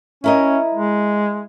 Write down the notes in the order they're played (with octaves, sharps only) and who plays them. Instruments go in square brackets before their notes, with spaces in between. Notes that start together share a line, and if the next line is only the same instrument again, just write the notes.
[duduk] C#4 [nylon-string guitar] E4 A#4 D#5
[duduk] G#3